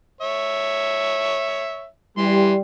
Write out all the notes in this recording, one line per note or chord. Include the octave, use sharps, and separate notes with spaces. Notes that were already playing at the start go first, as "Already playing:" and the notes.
C#5 E5
E3 G3 C6